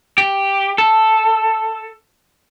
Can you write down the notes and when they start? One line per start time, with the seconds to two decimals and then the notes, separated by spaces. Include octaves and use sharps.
0.18 G4
0.78 A4